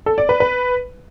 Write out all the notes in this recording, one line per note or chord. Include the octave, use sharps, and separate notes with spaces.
A4
D5
B4
B4